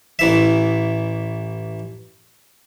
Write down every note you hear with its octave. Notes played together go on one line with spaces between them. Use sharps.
A1 E3 E5